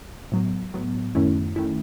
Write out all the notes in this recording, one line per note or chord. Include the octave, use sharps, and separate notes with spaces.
A2 F#3 B3
A2 F#3 B3
F#2 D#3 A3 C#4 E4
D#3 A3 C#4 E4